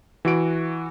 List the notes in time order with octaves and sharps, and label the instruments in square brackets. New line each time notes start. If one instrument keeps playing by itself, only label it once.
[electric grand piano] E3 F#4 D7